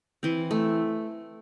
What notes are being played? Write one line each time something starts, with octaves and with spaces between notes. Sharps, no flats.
E3 C4
A3